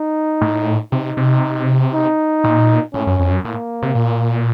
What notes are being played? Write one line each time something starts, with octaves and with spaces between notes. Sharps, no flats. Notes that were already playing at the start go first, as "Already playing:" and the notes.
Already playing: D#4
A2
C3 D#4
C3
D#4
A#2
A2 C#4
F#2
F2
F#2
A2 A#3
C3
A#2